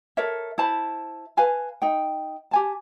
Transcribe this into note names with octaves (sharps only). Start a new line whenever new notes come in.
A4 A#4 C#5 E5
E4 C5 A5 B5
B4 F5 G#5 A5
D#4 G5
G4 G#5 A5